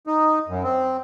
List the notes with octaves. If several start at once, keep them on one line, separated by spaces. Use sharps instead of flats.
D#4
F#2
C4